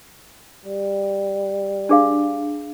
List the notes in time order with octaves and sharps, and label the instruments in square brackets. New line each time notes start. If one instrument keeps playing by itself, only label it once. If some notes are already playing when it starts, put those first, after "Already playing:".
[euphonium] G3
[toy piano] D4 G#4 F5